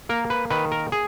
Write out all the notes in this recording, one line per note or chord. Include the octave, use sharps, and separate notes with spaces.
A#3 A#4
B4
D#3 B4
A#4
G#4